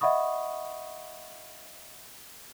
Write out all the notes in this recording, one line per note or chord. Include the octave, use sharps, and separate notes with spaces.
D#5 E5 F#5 B5 C#6 D#6